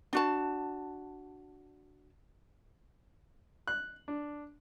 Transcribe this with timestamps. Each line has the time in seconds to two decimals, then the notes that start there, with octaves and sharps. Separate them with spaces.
0.13 D4 F#4 A5
3.68 F#6
4.08 D4